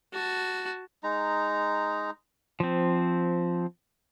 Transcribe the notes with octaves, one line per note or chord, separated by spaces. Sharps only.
F#4 A5
G#3 D#4 A#5
F3 C4